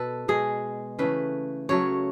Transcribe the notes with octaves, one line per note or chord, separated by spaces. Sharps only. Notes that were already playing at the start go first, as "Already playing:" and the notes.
Already playing: B2 A4 B4
B2 G#3 G#4
C#3 E3 A3 B4
C#3 F#3 A3 C#5